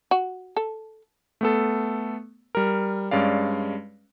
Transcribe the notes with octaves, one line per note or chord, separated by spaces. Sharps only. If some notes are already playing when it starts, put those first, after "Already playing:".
F#4
A4
A3 B3 A4
G3 A#4
G2 G#3 C#4 D5 F5